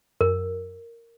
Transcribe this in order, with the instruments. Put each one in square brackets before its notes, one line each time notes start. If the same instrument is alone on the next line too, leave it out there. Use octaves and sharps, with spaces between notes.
[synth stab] F#2 [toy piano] A#4